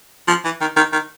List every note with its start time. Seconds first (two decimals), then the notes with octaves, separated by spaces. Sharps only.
0.28 F3
0.45 E3
0.61 D#3
0.77 D#3
0.92 D#3